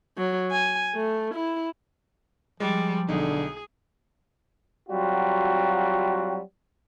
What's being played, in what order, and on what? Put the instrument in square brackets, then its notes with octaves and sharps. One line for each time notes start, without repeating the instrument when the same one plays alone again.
[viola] F#3
G#5
A3
E4
[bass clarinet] F3 [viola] G3 [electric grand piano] G#3
[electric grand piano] B1 D#4 [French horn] D3 [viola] G#4
[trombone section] F#3 G3 C4 F4 F#4